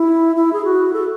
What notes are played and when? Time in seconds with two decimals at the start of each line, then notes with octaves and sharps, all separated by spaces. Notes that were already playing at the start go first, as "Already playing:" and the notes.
Already playing: E4
0.36 E4
0.53 G#4
0.65 F#4
0.93 A4